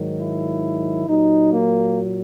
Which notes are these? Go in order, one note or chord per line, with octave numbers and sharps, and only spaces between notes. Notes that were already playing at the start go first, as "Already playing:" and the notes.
Already playing: G#2 D#3 F#3
E4
A#2 F#3 D#4
A#3